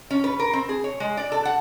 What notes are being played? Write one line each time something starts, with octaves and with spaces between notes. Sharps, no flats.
C#4
B4
A#4
C4
G#4
C#5
G#3
D5
A4
F#5